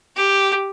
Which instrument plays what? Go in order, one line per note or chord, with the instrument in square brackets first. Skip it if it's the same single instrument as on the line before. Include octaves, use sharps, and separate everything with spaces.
[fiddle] G4